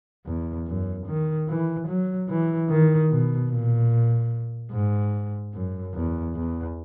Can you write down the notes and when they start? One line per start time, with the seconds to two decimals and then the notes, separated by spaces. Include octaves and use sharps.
0.26 E2
0.67 F#2
1.07 D#3
1.48 E3
1.88 F#3
2.29 E3
2.69 D#3
3.10 B2
3.50 A#2
4.72 G#2
5.53 F#2
5.94 E2
6.35 E2